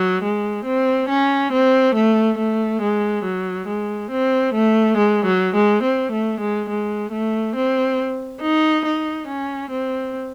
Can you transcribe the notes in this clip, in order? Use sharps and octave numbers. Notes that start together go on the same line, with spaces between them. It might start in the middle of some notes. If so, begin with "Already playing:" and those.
Already playing: F#3
G#3
C4
C#4
C4
A3
A3
G#3
F#3
G#3
C4
A3
G#3
F#3
G#3
C4
A3
G#3
G#3
A3
C4
D#4
D#4
C#4
C4